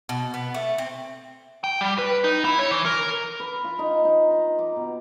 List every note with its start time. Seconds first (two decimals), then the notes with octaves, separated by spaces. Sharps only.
0.09 B2
0.34 B3
0.54 A3
0.78 C4
1.64 G5
1.81 G3
1.98 B4
2.24 D#4
2.45 E4
2.59 C#5
2.71 E3
2.86 A#4
3.40 B4
3.64 F4
3.79 D#4
4.05 D#4
4.30 A#5
4.59 D6
4.77 B2